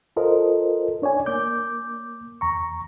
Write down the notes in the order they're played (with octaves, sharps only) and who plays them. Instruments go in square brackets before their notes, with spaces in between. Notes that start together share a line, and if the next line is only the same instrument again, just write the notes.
[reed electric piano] F4 A4 A#4 C5 D#5
D4 C#5 D5 G#5
A#3 D6 G6
E2 A#5 C#6